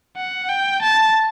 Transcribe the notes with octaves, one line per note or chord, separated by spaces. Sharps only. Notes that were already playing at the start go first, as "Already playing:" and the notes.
F#5
G5
A5